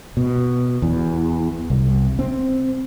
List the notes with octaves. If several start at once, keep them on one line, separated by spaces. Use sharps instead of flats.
B2
E2
C2
C4